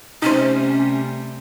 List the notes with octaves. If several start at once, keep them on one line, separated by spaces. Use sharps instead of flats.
C3 G3 A3 C#4 D#4 C5